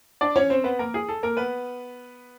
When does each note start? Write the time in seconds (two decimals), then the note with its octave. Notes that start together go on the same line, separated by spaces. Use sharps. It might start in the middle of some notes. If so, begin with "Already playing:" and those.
0.21 D4 D5
0.36 C#4 C#5
0.50 C4 C5
0.64 B3 B4
0.79 A#3 A#4
0.94 G#4
1.09 A4
1.23 A#3 A#4
1.37 B3 B4